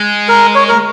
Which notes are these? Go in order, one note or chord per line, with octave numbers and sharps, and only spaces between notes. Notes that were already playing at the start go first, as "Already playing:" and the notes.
Already playing: G#3
A#4
C#5
A#4